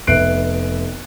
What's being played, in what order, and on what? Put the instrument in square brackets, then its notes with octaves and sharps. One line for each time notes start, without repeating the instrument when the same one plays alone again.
[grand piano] F1 B3 E5 F#6 C7 D7